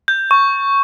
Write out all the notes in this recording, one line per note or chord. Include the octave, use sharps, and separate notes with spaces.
G6
C#6